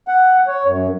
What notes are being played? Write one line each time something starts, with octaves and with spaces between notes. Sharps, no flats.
F#5
C#5
F#2